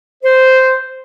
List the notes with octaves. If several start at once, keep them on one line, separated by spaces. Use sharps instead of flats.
C5